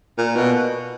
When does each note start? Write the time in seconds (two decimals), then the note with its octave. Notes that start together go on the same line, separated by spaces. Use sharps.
0.18 A#2
0.36 B2